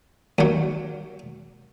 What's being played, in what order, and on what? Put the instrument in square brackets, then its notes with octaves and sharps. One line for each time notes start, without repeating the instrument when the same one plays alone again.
[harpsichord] D#2 F#3